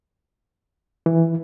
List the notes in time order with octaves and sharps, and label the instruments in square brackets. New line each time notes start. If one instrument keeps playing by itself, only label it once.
[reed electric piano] E3